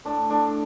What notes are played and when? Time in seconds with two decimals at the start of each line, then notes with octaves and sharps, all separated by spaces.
0.05 A2 D4
0.30 A2 D4